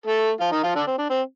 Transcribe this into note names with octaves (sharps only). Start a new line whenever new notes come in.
A3 A4
F3 F4
D#3 D#4
F3 F4
D3 D4
C4
D4
C4